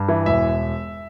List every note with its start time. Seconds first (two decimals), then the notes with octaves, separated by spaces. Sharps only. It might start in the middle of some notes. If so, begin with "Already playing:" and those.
Already playing: G2
0.08 E3
0.26 E1 E5